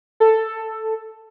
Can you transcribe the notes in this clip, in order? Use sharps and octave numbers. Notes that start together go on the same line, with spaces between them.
A4